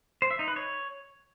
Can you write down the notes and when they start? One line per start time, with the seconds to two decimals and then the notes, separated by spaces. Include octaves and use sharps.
0.22 C5
0.31 E5
0.39 D#4
0.48 B4
0.56 C#5